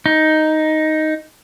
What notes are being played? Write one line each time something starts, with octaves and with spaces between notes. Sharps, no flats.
D#4